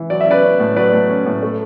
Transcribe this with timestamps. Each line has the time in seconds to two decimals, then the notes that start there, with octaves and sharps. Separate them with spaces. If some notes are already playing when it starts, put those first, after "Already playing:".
Already playing: E3
0.10 F#3 D5
0.21 E5
0.27 C#4 B4 D5
0.43 C#4
0.60 A2
0.76 F#3 B4 D5
0.93 A2
1.09 C#4
1.26 A2
1.43 A3